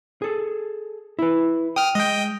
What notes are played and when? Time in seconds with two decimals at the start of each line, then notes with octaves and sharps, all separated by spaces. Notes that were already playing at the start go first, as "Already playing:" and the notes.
0.22 G#4 A4
1.19 E4 B4
1.76 G5 D#6 F6
1.95 G#3 D#5 G5